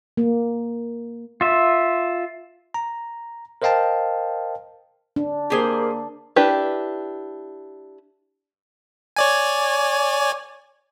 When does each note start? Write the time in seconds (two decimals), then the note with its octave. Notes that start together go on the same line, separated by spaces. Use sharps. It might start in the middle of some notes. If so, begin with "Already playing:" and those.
0.17 A#3
1.41 F4 E5
2.74 A#5
3.62 A#4 C5 D#5 F5 G5 A5
5.16 D4
5.50 A#3 G4 G#4 C5
6.36 D4 E4 G4 B4
9.16 C#5 D5 G#5